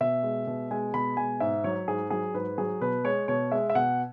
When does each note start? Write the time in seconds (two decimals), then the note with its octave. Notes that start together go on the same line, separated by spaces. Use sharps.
0.01 B2 E5
0.23 G#3
0.47 B2
0.71 G#3 G#5
0.94 B2 B5
1.17 G#3 G#5
1.40 G#2 E5
1.64 F#3 C#5
1.88 G#2 G#4
2.10 F#3 G#4
2.34 G#2 B4
2.58 F#3 G#4
2.81 B2 B4
3.05 G#3 C#5
3.28 B2 C#5
3.52 G#3 E5
3.70 E5
3.75 B2 F#5